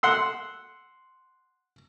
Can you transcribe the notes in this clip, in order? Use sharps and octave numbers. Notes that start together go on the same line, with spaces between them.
F#5 C6 E6